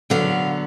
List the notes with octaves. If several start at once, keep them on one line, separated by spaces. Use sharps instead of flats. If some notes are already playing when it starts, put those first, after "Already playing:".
D3 F#3 B3 F5